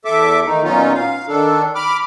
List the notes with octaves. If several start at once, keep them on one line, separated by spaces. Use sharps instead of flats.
E2 A4 E5 D6
D#3 A3 D#4
A#2 F#3 B3 C#4 D#4 F4
F5
D#3 D4 A4
B5 D6 F6